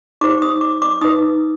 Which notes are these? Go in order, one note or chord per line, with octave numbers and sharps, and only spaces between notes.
D#4 G4 C5 D6
D#6
D6
D6
D#4 B4 D#6